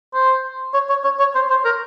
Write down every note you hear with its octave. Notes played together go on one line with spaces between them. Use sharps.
C5
C#5
C#5
C#5
C#5
C5
C5
A#4